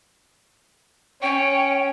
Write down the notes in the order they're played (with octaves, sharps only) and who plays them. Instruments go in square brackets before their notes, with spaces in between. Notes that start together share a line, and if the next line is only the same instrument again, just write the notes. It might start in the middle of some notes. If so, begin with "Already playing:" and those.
[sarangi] C#4 [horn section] C#5 [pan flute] G5